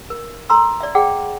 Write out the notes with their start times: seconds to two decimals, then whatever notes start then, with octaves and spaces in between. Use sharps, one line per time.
0.10 A#4
0.50 A4 A#5 C6 E6
0.81 D5 E5
0.95 G#4 D5 F#5 G5